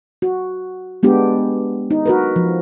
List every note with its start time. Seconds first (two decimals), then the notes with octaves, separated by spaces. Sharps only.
0.22 F#4
1.03 G#3 B3 D4 G4
1.91 D#4
2.06 F#4 A#4 B4
2.36 F3